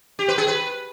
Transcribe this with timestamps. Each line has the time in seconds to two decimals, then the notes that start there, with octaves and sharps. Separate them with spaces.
0.19 G4
0.28 B4
0.38 G#4
0.48 B4